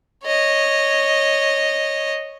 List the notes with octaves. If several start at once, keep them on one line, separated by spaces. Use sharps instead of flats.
C#5 D#5